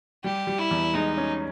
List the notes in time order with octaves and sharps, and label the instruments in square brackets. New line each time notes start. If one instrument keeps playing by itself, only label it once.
[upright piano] G3 [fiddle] G4
[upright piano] G3
[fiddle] E4
[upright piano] E2
[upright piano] G#3 [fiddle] D#4
[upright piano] C#4